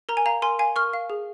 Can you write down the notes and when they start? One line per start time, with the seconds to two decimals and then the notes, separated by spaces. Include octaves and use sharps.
0.09 A#4 A#5
0.17 G#5
0.26 F5 A#5
0.42 A#4 G#5 C6
0.59 F5 G#5
0.76 A#4 C#6 F6
0.93 F5
1.10 G#4